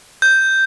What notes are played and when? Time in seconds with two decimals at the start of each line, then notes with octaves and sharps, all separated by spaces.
0.22 G6